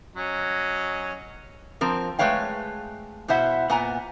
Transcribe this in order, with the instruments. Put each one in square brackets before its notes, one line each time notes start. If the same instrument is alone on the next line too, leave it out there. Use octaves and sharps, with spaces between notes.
[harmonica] F#3 C#4 D#5
[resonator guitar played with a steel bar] F3 C4 A#4
G#3 A3 B4 C#5 F5 G5
B2 E4 C5 E5 F#5
A#2 B3 F#5 G#5 A#5